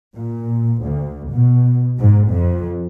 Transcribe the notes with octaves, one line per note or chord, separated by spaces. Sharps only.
A#2
D2
B2
G#2
F2